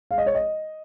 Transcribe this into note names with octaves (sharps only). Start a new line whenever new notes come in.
G#3 F5
D#5
C#5
D#5